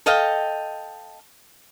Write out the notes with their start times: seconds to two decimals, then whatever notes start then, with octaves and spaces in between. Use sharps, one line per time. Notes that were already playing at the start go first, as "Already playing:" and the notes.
0.06 A4 D#5 F5 G5